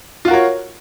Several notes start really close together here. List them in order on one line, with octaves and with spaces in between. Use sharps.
F4 F#4 A#4 C#5